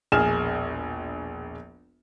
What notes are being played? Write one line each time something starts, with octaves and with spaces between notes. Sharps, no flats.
E1 A#1 G#4 G#5 F6 E7